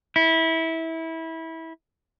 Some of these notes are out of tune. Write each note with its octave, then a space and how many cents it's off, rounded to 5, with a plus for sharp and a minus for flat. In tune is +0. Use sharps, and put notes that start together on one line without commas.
E4 -20